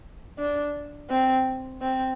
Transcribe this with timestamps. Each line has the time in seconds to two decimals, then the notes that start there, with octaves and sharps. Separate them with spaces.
0.39 D4
1.10 C4
1.81 C4